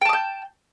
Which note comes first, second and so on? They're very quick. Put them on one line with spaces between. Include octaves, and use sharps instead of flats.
G5 A5 D#6 G6